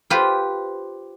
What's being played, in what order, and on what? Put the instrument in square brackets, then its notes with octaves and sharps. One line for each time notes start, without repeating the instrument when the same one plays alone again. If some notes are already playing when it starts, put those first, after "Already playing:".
[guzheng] F4 G4 B4 C5